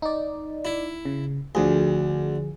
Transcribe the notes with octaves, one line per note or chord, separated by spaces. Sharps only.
D#4 D5
E4
C#3
D2 D3 F3 G#4